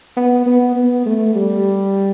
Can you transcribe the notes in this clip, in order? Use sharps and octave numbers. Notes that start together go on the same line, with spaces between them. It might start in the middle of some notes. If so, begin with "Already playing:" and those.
B3
B3
B3
A3
G3